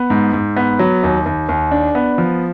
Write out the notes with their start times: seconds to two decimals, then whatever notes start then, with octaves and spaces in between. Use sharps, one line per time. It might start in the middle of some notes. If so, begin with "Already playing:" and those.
Already playing: B3
0.10 G#2
0.33 G#2
0.56 B3
0.79 F#3
1.03 D#2
1.26 D#2
1.49 D#2
1.71 D4
1.95 B3
2.18 F3